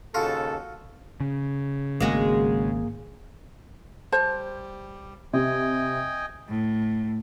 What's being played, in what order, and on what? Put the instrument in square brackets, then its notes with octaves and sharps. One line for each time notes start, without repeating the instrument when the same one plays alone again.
[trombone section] D#2 C#3 A4 [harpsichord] F4 F#4
[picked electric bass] C#3
[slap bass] G#1 G#2 C4 [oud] G#3 F#4 [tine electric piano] A#3 G#4
[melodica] G3 [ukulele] C5 A5
[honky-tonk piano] C3 [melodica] D#5 G5 G#5
[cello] A2